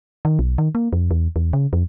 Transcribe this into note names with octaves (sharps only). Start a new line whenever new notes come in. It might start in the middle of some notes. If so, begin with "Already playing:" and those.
D#3
B1
D#3
A#3
F2
E2
E2
C#3
F2